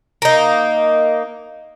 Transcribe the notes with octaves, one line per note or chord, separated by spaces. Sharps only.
A#3 D#4